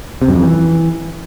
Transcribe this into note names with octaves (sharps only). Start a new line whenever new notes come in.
C3
F#2
F2
E3